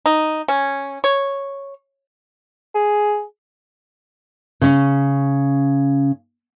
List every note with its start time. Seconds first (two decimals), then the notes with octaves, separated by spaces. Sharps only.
0.06 D#4
0.48 C#4
1.04 C#5
2.75 G#4
4.61 C#3 C#4